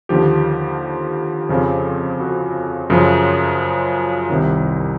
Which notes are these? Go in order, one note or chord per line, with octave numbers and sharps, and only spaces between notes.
D#2 D3 F3 G4
F2 C#3 F3
F#4
F#2 C#3 F3
C2 C3 D#3